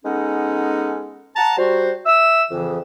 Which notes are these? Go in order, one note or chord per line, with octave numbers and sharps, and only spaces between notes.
G#3 B3 C#4 D#4 A4 F#5
F#5 A5 A#5
G3 F#4 C5
E5 E6
F2 C#3 E3